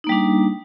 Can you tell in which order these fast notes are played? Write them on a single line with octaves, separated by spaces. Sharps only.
D#4 A#3 G3 D4